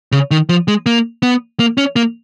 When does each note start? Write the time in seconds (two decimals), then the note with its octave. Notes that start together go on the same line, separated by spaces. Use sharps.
0.12 C#3
0.31 D#3
0.49 F3
0.68 G#3
0.86 A#3
1.23 B3
1.60 A#3
1.78 C#4
1.96 A#3